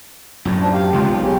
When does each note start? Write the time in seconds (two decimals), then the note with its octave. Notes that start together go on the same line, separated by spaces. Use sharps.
0.45 F#2 A2
0.61 F3 D4
0.73 G4 F5
0.93 C#2 C3 G#3 F4 G4
1.08 B1
1.22 C#3 C#4 G4